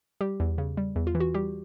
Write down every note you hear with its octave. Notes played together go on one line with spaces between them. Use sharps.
G3 G4
E2
C#3
G3
E2
F4
E3
F#4
G3 G4